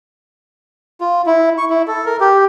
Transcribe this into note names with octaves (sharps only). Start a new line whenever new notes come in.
F4
E4
C#6
E4
A4
A#4
G4